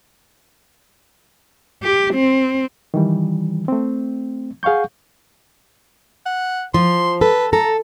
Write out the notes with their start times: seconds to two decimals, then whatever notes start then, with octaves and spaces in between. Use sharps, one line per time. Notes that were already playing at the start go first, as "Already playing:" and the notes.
1.83 G4
2.14 C4
2.94 D#3 E3 G3
3.68 A3 C4
4.63 G#4 F5 F#5 C#6 G6
6.26 F#5
6.74 F3 C6
7.21 A4 B4
7.53 A4 A#5